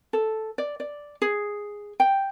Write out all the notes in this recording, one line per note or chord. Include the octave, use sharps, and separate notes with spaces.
A4
D5
D5
G#4
G5